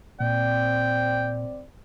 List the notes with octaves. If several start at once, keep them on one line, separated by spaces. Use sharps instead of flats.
A#2 C4 D5 G5